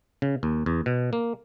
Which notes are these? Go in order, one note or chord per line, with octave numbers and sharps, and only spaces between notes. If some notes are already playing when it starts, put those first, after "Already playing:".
C#3
D#2
E2
B2
A#3